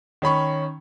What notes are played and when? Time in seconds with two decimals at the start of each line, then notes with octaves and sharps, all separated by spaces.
0.22 D#3 C#4 B5 C#6